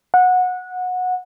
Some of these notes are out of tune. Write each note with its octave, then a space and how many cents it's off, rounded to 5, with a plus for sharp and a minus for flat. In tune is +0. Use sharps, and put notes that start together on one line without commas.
F#5 -20